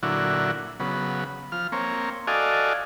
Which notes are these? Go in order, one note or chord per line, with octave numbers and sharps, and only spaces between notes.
A#2 D3 F#3 E4 F#4
C#3 F#3 B3
F3 F6
A#3 C4 C#5
F#4 A4 D5 D#5 F5 G#5